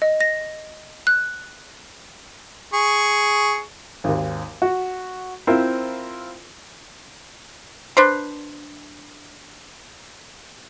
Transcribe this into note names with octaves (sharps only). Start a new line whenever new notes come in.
D#5
A#6
F#6
G#4 C#6
G#1 D#2
F#4
C4 E4 F4 A#4 C5
D4 B4 C5